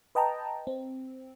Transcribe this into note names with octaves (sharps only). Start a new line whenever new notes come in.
B4 D#5 G5 A5 A#5
C4